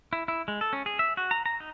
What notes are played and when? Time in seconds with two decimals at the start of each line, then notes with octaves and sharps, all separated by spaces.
0.13 E4
0.28 E4
0.48 G#3
0.61 A4
0.73 C#4
0.86 G#4
0.99 E5
1.17 F#4
1.31 A#5
1.46 A#5
1.60 D#4